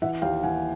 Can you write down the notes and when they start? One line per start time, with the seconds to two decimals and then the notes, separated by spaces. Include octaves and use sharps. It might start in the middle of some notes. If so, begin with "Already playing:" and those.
0.02 E3 E5 F#5
0.22 D#2 F5 G5
0.43 E3 F#5 G#5